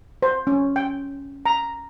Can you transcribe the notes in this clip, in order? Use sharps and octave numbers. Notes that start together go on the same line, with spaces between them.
C5
C#4
G5
A#5